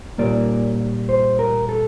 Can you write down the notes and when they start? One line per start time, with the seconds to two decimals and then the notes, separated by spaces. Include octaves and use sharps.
0.18 A#2 G3 A#3 D5
1.09 C5
1.39 A#4
1.69 A4